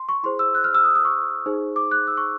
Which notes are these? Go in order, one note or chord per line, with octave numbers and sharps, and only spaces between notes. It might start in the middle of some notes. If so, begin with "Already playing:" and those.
Already playing: C6
C#6
E4 G#4 C5 C6
E6
F#6
F6
E6
D#6
D#6
C#6
D#4 G#4 C5
D6
F#6
E6
C#6